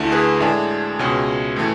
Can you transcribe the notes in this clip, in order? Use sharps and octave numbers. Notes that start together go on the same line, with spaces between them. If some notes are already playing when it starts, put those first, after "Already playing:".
Already playing: D2 D3 A3 E4
G#4 B4
A2 G#3 D4 E5 G#5
C#2 B2 G#3 C#4
A2 E3 A3